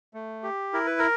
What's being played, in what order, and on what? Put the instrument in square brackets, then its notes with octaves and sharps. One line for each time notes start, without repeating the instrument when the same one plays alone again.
[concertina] A3
G4
E4 A#4
B4
A#4